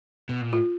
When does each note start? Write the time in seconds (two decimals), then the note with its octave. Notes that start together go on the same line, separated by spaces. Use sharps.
0.29 B2
0.42 A#2
0.52 A2 F4